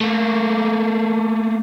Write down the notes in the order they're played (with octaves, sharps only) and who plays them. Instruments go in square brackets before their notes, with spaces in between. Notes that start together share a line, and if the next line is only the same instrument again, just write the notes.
[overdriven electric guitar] A3 A#3